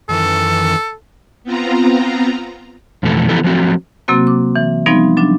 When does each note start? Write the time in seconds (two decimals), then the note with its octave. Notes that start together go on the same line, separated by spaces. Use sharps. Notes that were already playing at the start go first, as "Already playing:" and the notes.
0.09 F#2 D#3 E3 A4
1.44 B3 C4 F4 A#5
3.03 F2 B2 E3 A3 A4
3.29 E3 F3 B3 E4 G4 A4
3.44 F3 F#3 A3 C4 F#4
4.08 C3 F#3 A#3 C4 F#4
4.27 D6
4.56 E3
4.86 F3 G3 B3 C4 D#4
5.17 F#3 D4